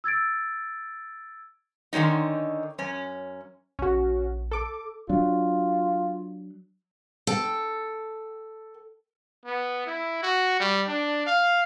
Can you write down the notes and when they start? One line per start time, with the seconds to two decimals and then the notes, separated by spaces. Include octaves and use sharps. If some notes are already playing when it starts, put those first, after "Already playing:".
0.04 E6 G#6 A6 D7
1.93 D3 D#3 G#3 C#4 D#4
2.78 F#2 C#4
3.79 A#1 C#4 F#4
4.51 A4 D6
5.09 F#3 D4 F4
7.27 A4 G5
9.45 B3
9.86 E4
10.23 F#4
10.60 G3
10.88 D4
11.27 F5